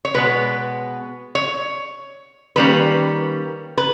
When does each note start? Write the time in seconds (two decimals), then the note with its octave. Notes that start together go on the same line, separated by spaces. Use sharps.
0.05 C#5
0.14 B2 G#3 B3 B4
1.35 C#5
2.56 D#3 G3 A#3 C#4 B4
3.77 B4